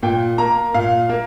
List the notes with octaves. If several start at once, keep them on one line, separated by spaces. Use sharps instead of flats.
A#2 G5
A#3 A#5
A#2 F5
A#3